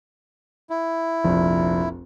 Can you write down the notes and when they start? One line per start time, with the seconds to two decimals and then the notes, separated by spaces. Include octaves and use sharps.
0.70 E4
1.24 F1 A#1